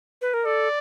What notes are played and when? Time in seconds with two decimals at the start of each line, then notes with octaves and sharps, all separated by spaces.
0.22 B4
0.34 A#4
0.45 A4 D5